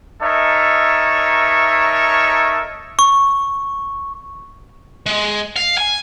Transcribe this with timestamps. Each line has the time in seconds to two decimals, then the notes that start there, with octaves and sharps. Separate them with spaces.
0.22 D#4 A4 A#4 C#5 E5
2.99 C#6
5.06 G#3
5.56 F5
5.78 G#5